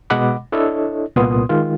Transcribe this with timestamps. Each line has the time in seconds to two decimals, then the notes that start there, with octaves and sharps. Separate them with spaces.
0.10 B2 G#3 D#5 F#5 B5 D6
0.52 D4 E4 A4 C#5 D#5
1.16 C2 A#2 B3 C6 D#6
1.49 D#3 G#3 F4